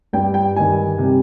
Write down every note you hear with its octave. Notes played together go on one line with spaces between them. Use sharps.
G2 G3 G5
G5
G2 D#3 G3 G#5
C3 G3